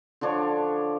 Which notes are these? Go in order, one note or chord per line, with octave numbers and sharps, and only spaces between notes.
D3 F3 D4 C#5